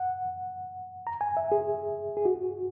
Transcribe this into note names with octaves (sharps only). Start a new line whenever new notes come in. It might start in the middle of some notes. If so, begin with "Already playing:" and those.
Already playing: F#5
A#5
G#5
E5
G#4
G#4
F#4